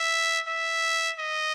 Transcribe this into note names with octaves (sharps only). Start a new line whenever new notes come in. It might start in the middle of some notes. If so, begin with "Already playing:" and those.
Already playing: E5
E5
D#5